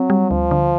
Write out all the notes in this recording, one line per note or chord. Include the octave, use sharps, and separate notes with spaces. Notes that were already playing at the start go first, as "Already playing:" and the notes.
Already playing: F#3 C4
G3
D2 F3
D3